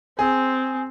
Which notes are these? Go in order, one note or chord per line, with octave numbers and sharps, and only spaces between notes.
C4 G#4